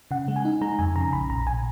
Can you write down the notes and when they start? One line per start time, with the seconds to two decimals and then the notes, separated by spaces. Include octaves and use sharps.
0.11 C#3 F#5
0.28 G#3
0.36 G#5
0.45 D#4
0.61 G#3 A#5
0.79 F2 G#5
0.96 C#3 A#5
1.13 A#1 B5
1.29 A#1 A#5
1.46 A#1 G#5